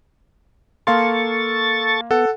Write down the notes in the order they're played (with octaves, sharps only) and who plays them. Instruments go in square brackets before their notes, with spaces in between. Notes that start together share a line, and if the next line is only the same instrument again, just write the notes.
[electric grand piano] A#3 F5 C6 [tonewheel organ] A4 C#6 A6
[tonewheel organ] B3 [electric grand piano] A4 F#5